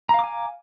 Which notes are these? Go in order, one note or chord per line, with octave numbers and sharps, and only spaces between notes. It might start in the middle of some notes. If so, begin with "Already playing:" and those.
F5 G#5 A#5 D6